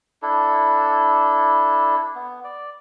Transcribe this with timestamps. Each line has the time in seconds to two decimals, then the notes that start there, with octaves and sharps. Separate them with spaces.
0.22 D4 E4 A4
2.15 B3
2.44 D5